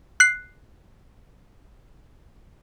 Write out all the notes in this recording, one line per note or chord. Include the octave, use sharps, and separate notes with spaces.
F#6 C7